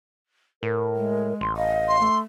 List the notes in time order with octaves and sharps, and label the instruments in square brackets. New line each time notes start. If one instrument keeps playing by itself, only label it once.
[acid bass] A2 [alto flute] A#4
[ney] G#3
[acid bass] A1 [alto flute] C6
[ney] D#5 [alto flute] F5
[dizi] C6
[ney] A3